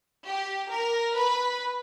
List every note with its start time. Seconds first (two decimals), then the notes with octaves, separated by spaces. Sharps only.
0.25 G4
0.71 A#4
1.15 B4